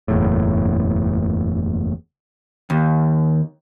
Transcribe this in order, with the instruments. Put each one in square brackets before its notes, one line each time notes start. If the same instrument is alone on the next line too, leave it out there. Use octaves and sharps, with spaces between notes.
[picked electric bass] F#1 E2 A2
[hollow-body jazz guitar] D#2